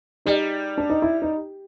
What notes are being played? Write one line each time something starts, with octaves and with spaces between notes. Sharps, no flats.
G3 D#4
D4
D#4
E4
D#4